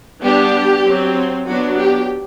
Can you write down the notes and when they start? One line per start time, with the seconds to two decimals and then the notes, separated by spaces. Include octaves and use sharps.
0.22 G3 B3 D4 G4
0.85 F#3 C4
1.46 F#3 B3 D4 F#4
1.78 G4